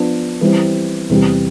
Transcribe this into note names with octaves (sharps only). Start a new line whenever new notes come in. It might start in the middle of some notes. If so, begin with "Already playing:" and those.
Already playing: F3 B3 D4
E3 G3 C4
E2 C3 G3